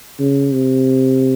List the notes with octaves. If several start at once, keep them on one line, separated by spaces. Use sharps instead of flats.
C#3
C3